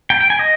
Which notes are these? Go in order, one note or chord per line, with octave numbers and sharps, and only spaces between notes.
G5
G5
G#5
D#5